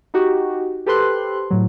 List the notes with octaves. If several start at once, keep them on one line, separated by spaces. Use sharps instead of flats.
D#4 F#4 G4
G4 A4 B4 C5 C6 F#6
A2 F#3